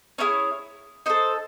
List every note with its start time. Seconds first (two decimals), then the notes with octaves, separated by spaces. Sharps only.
0.18 C#4 E4 G#4 C#5
1.06 D#4 A4 C5